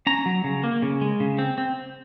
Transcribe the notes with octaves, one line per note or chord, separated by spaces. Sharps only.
C#4 A#5
F#3
C#3
A#3
C#3
G#3
C#3
C4
C4